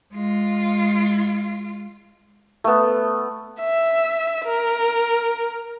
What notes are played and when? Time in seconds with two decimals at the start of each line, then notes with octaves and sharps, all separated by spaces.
0.13 G#3 F4
2.64 A3 B3
3.61 E5
4.45 A#4